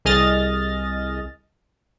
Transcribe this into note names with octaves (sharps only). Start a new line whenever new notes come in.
C2 G#4 D#5 F6 A6 A#6